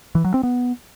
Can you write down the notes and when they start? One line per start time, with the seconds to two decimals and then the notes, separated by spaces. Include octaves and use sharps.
0.15 E3
0.24 F#3
0.34 C4
0.43 B3